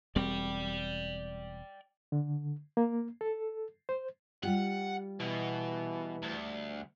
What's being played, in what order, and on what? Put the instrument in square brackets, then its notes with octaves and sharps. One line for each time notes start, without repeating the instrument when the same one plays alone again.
[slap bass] E1 G3 C4 [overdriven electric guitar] D5 G5
[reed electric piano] D3
A#3
A4
C5
[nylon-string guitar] G3 F4 G4 [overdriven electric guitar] F#5
[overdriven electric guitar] B2 [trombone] E3
[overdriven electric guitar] D2